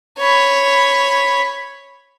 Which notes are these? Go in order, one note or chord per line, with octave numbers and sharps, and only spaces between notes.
C#5 B5